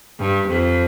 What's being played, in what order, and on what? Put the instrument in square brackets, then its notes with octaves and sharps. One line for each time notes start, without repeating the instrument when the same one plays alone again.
[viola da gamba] G2
F2